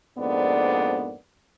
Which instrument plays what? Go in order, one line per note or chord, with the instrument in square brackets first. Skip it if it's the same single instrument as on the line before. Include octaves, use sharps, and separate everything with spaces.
[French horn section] F2 G#2 A#3 B3 D4 D5